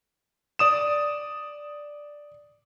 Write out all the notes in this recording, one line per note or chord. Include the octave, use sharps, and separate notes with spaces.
D5 D#6 E7